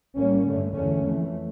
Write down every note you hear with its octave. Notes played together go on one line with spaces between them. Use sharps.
A2 G3 A#3 C#4
G2 D3 A3
E2 D3 A3 C#4
F2 E3 A3